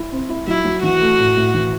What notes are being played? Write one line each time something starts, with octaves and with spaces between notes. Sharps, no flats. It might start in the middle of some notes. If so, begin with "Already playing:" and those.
Already playing: E4
C4
E4
F#3 E4
F#3
E3 F#4
A3
A2
A2
E3